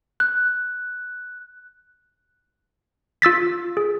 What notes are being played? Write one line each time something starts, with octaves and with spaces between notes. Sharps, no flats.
F#6
F4 E6 A6 B6
G#4